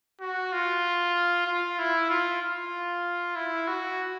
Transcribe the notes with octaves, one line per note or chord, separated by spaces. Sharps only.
F#4
F4
F4
E4
F4
F4
E4
F#4